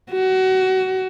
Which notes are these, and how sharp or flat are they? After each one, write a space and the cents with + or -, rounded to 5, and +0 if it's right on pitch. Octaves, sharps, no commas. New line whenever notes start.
F#4 +25